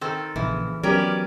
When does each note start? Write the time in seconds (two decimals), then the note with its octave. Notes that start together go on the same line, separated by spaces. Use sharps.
0.01 D#3 C4 A4
0.36 A#1 C#3 E3
0.83 F#3 B3 C#4 G4 A#4 D5